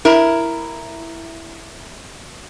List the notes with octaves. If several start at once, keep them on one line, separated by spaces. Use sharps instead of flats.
E4 A#4